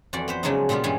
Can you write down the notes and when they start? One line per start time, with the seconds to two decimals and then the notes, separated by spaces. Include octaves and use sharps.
0.13 F2 E3 F#4 D5
0.28 B3 B4 C5
0.43 C#3 F3 F#3 G#3 D4 D#4
0.69 A#2 G3 G#3 B3 F4
0.84 G2 E3 G#3 C#4 G#4 F5